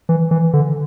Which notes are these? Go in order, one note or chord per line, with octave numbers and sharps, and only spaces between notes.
E3
E3
D3